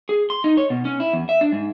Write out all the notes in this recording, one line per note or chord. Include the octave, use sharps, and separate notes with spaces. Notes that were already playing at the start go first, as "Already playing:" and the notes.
G#4
C6
D#4
C#5
B2
C#4
E4
E2
E5
D4
G#2